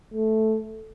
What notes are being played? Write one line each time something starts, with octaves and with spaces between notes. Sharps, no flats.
A3